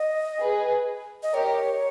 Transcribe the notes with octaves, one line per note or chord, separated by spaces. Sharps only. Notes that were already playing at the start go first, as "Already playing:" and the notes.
Already playing: D#5
G#4 B4
D#5
G4 A#4 C#5